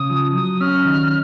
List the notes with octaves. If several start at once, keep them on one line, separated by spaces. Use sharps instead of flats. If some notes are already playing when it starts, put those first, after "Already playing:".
Already playing: C#3 D#6
F3
F#3 D#6
C#4 F6
D#3